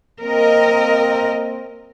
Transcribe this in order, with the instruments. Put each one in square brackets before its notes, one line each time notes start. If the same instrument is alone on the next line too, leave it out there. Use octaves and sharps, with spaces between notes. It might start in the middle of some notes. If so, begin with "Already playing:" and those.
[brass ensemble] A#3 C4 [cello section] A#4 D#5